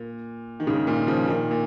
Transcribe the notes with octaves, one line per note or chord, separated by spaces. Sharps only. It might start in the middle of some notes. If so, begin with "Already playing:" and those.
Already playing: A#2
D#3
G#2 C#3
A#2 D#3
C#3 F3
A#2 D#3
A#2